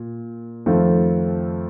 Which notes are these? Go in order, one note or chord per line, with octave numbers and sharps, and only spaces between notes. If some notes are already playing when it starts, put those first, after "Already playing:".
Already playing: A#2
F2 D#3 A3 C4 F4